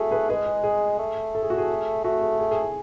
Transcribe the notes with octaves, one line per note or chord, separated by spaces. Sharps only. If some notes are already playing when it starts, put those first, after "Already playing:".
Already playing: A3 F#4 G#4 A4
G#4 B4
G#3 G#4 B4
G#4
G#4
A3
A4
G#4
F#4
G#4
A3 F#4
G#4
G#4
G#4
G#4